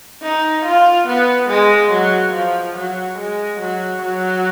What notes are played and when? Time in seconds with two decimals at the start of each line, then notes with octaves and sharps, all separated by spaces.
0.23 D#4
0.66 F4
1.08 B3
1.50 G#3
1.92 F#3
2.33 F3
2.76 F#3
3.18 G#3
3.59 F#3
4.02 F#3